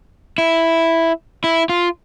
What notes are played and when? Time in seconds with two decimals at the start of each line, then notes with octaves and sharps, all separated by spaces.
0.38 E4
1.44 E4
1.69 F4